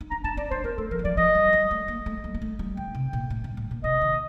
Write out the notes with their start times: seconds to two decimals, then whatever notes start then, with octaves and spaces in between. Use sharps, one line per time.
0.01 D#4
0.11 D4 A#5
0.24 D4 A5
0.37 C4 D5
0.51 D4 C5
0.64 C4 A#4
0.78 A3 A4
0.91 F3 A#4
0.99 G3
1.04 F3 D5
1.17 F3 D#5
1.35 G3
1.53 G3
1.71 A3
1.88 A#3
2.06 A3
2.24 G3
2.34 A#3
2.42 A3
2.59 G3
2.77 D3 G5
2.95 C3
3.13 A#2
3.30 A2
3.44 G2
3.57 A2
3.71 A#2
3.84 C3 D#5
4.02 D#3